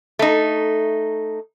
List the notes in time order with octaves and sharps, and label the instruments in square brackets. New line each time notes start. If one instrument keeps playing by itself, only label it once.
[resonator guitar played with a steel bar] A3 D#4